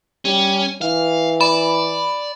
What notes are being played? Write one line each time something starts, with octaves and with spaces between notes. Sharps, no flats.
G3 C#4
E3 F5
D5 B5